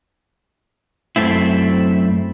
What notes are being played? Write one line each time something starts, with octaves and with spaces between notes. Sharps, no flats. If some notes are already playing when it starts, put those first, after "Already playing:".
F#2 A3 C4 E4